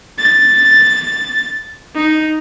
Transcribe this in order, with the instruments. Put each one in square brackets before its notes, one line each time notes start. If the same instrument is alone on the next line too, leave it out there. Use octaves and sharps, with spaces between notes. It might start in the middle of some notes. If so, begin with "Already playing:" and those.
[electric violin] A6
D#4